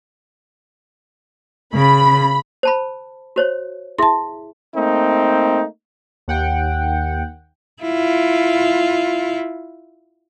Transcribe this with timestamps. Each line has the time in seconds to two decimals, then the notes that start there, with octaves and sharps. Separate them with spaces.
1.75 C#3 B5
2.63 C5 A5 B5
3.36 F#4 C5 C#5
3.99 E4 G#4 E5 A5 C6
4.75 A3 A#3 C4 D#4
6.28 D#2 F#5 G5
7.82 E4 F4